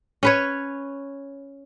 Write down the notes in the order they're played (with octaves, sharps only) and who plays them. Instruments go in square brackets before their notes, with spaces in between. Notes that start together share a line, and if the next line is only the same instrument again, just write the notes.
[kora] C#4 B4 C#5